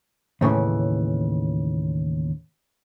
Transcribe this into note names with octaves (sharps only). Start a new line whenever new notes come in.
D#2 A2 C#3 E3